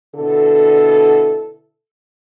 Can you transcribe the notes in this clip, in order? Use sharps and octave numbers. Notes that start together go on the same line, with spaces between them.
B2 D3 E4 A4